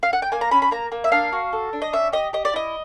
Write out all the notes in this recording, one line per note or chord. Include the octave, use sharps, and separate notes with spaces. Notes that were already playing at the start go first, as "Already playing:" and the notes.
F5
F#5
G5
A#3 G#5
A#5
C#4 B5
B5
A#3 A#5
A#3
E5
D4 F5
F#4
A4
D4
D#5
C#4 E5
G4 D#5
G4 D#5
D5
E4 D#5